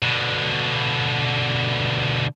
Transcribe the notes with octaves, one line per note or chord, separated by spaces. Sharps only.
B2 D3